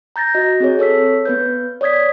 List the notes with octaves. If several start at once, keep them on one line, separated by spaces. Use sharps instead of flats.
A#5 G6 A6 A#6
F#4 D#5
C4 G#4 C#5
A4 C#5 E6 B6
B3 B4 G6
C#5 D5 D#6 G#6 B6